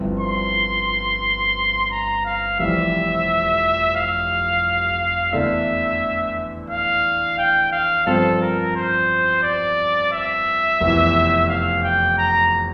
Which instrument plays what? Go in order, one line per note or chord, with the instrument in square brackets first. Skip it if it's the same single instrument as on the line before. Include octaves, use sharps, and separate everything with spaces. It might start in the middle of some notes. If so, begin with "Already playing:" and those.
Already playing: [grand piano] G1 G2 F3 C4 E4
[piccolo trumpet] C6
A#5
F5
[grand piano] F1 F2 E3 G3 [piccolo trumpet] E5
[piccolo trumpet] F5
[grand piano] E2 D3 A3 D4 [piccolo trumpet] E5
[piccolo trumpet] F5
G5
F5
[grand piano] G2 F3 C4 [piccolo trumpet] A4
[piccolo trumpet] A#4
C5
D5
E5
[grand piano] F1 E2 E3
[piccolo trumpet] F5
G5
A#5